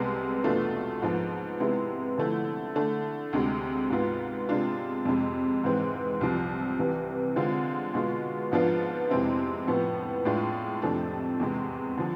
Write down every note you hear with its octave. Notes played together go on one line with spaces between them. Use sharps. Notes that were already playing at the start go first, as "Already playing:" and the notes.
Already playing: C2 C3 G#3 B3
E2 B2 A3 D4 F4
G#2 F3 B3
C3 G#3 B3 E4
D3 F3 A3 E4
D3 A3 D4
D2 C3 G#3
G#2 G#3 B3 F4
C3 G#3 D4 F4
F2 C3 G#3
G#2 E3 G#3 C4
C2 C3 F3
C2 C3 E3
D3 G#3 C4 F4
B2 G#3 B3 F4
G#2 F3 B3 D4 F4
F2 C3 G#3 C4 E4
A2 F3 B3
A2 G#3 D4 F4
F2 C3 F3 A3 D4
E2 C3 G#3
D3 F3